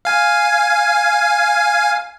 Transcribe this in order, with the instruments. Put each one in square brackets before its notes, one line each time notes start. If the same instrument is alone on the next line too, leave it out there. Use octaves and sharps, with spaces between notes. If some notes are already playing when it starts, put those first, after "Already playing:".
[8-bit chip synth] F5 G#5